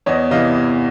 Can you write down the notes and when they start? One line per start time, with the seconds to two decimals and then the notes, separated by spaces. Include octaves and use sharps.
0.06 E2 C#5 D#5
0.31 C3 E3 D#5 F5